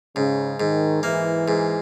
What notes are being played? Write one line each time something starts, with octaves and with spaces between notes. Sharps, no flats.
G#2 C#3
G#2 D#3
E3 A#3
G#2